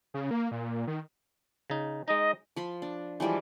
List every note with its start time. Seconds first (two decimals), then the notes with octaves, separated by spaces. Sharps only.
0.14 C#3
0.31 A#3
0.51 A#2
0.87 D#3
1.70 C#3 D#4
2.08 G#3 D#4 D#5
2.56 F3 B5 C6
2.82 D4
3.20 E3 F3 G3 G#3